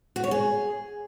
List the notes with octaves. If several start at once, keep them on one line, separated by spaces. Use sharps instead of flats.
F#4
C#5
G#4